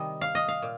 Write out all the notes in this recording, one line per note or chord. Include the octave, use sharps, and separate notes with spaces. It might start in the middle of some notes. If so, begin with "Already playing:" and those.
Already playing: C3 D#3 G3 D#5
F5
D#5
F5
A#2